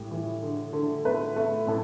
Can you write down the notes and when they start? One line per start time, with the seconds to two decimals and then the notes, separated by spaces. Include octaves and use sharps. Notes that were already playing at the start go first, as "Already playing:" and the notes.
Already playing: A2 G3 G4
0.11 E3
0.42 D3
0.73 D3
1.05 A3 B4
1.36 A3
1.67 A2 A4